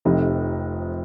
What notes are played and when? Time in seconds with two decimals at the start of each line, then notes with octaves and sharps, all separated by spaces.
0.05 F1 F2 C3 F3 D#4